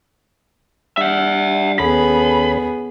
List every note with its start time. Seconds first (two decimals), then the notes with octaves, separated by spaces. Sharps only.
0.97 G3 D4 E5 F#5
1.79 D#2 B3 C#4 G#4 A4 B5